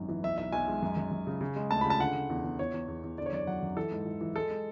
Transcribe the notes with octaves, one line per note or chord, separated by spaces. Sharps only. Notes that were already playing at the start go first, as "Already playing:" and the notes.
Already playing: G#1 F#2
E3
B1 E5
B1 E5
B1 G#5
G#3
F#2
F#2
F#2
C#3
C#3
G#3
D2 A5
C#3 B5
A5
D3 F#5
D3
E2
E2
E2 C#5
E2
E2
E2
D3 D5
C#5
F#2 D5
F#3 F#5
F#2
E3 A4
G#2
E3
E3
G#3 A4
G#3